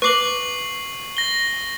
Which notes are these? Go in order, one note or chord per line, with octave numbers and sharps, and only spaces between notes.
B4 C#6 D6 C7 F#7
A#6 G7